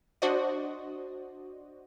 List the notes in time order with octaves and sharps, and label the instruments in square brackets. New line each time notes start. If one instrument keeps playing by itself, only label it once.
[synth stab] D4 F#4 C5 D5 D#5